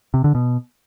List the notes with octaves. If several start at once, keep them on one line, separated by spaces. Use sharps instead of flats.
C3
D3
B2